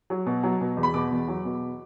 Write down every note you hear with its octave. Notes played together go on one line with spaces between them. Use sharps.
F#3
B2
F#3
B2
E2
B5
B2 D6
E2
F#3
B2